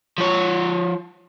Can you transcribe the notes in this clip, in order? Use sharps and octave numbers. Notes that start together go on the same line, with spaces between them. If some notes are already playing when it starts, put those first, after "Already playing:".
F3 C#5